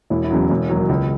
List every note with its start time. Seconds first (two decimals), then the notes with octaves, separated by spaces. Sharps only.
0.10 E1 E4
0.24 E4
0.31 E2 C#3 F#3
0.50 E1
0.70 D#2 D#3 F#3
0.89 C#2